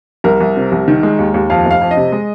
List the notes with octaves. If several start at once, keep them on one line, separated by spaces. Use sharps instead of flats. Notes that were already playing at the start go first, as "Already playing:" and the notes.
C2 A#4
C2
C3
C2
D#3
G#3
D#2
D#2
F2 F5
F1
F5
F2
D#5
C3
G#3